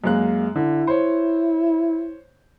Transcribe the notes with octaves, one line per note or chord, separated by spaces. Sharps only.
F#2 G#3 A#3 F#6
D3 E4
C5 C#5